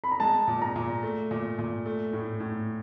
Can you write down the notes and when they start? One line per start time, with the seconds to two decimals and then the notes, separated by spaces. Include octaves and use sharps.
0.04 B5
0.12 A#5
0.20 G#3 A5
0.48 A#2
0.62 A#5
0.76 A#2
1.03 A3
1.31 A#2
1.59 A#2
1.86 A3
2.13 A2
2.40 A2